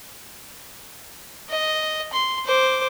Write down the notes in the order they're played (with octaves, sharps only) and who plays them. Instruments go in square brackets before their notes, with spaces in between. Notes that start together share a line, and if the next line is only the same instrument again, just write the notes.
[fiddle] D#5
C6
C5 D6